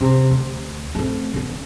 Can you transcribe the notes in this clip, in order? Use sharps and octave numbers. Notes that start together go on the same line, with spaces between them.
C3
D2
A3 C4
D3 B3